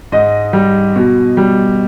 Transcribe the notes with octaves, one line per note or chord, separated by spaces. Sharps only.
G#2 D#5
G3
B2
G3